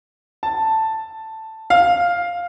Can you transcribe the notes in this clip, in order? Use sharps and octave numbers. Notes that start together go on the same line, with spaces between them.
A5
F5